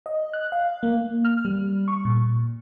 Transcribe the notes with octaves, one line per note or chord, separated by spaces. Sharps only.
D#5
F#6
F5
A#3
F6
G3
C#6
A#2